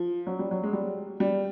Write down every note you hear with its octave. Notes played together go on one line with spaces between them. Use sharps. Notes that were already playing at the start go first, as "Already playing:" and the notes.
Already playing: F3
F#3
G3
F#3
G#3
G3
G3